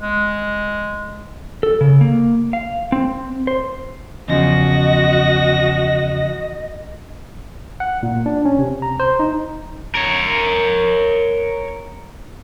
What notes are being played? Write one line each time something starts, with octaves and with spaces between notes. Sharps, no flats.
G#3
A4
C#3
A#3
F5
C4
C5
E2 C#3 F3 F#4 D#5 A#6
F#5
A#2
D4
C#4
C3
A#5
C5
D#4
A#4 C#5